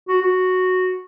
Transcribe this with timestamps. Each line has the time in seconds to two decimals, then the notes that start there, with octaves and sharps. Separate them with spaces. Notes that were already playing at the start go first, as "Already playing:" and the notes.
0.08 F#4
0.22 F#4